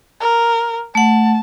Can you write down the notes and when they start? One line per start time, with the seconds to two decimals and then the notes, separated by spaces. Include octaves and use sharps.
0.20 A#4
0.95 A3 F#5 A5